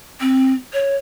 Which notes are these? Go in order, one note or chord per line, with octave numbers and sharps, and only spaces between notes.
C4
C#5